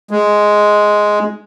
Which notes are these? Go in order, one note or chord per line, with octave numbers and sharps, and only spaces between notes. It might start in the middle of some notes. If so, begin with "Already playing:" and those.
G#3